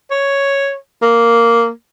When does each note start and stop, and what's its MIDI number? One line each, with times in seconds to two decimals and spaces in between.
0.11 0.75 73
1.02 1.70 58